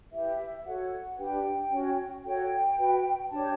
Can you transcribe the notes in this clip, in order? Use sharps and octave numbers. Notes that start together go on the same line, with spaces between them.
E4 G4 B4 E5
F#4 A4 C#5 F#5
D4 G4 B4 G5
C#4 F#4 C#5
F#4 A4 C#5 G5
F#4 B4
D4 G4 C#5 A5